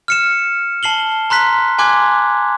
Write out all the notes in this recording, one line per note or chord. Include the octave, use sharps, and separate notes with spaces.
F6 C#7 E7
A5 C7 F#7 G7
A#5 C6 F#6 B6
G#5 C6 D6 F#6 G#6